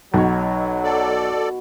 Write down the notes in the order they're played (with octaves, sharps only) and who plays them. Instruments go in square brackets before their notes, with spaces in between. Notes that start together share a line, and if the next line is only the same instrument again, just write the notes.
[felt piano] B1 [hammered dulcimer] B2 C#5 [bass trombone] F#3
[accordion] A4 D5